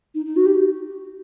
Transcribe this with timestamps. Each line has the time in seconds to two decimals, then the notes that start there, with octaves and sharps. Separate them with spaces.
0.14 D#4
0.26 D#4
0.36 F#4
0.46 G4